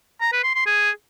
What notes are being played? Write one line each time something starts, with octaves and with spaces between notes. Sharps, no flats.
A#5
B4
C6
C6
G#4